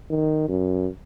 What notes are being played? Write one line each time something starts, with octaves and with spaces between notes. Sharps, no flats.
D#3
F#2